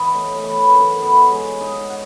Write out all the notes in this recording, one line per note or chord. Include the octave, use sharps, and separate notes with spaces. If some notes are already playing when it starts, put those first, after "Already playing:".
Already playing: E3 B3 E4 D#5
A3 C#5
C#5
E3
B4
F#2
A4
B3 B4
G#3 C#5
D#4 D#5
F#5